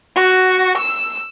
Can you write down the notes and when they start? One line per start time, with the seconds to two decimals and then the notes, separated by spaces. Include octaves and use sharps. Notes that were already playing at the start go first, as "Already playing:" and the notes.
0.15 F#4
0.78 E6